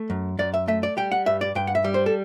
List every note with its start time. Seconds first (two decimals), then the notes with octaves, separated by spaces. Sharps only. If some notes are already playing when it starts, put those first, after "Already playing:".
Already playing: A3
0.10 F#2
0.39 F#2 D5
0.54 E5
0.68 A3 E5
0.83 D5
0.97 G3 G5
1.11 F#5
1.26 G2 E5
1.41 D5
1.55 G2 G5
1.67 F#5
1.75 E5
1.84 G3
1.94 C5
2.06 A4